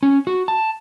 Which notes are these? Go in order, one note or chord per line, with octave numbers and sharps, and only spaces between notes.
C#4
F#4
A5